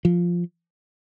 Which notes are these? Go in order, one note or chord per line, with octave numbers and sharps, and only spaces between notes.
F3